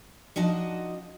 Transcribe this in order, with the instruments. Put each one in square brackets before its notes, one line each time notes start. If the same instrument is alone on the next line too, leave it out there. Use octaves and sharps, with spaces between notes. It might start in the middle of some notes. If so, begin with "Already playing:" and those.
[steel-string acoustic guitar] F3 D4 D#4 F#4 D#5